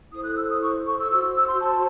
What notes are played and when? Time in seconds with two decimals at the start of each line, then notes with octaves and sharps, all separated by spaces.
0.12 E4 A4 C5 D#6
0.24 F#6
0.37 E6
0.49 D#6
0.61 C#6
0.87 C#6
0.99 E6
1.11 F#4 C5 E6
1.36 E6
1.48 C6
1.60 A5